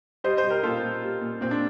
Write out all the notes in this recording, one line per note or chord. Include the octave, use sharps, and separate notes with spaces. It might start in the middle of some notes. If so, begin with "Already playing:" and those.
G3 C5 D#5
C5 D#5
G3
G4 A#4
A#2 F4 A4
A#2
G3
A#2
A#2 C4
D4